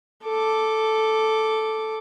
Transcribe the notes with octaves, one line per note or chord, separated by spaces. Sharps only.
A4 D6